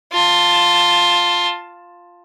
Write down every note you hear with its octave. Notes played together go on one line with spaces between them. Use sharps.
F4 A5